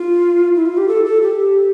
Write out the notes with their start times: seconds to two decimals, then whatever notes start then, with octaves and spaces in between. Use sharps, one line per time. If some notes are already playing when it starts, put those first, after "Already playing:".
Already playing: F4
0.55 E4
0.65 F4
0.77 G4
0.88 A4
1.05 A4
1.22 G4